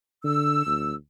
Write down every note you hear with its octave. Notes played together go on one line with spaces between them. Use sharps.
D3 E6
D2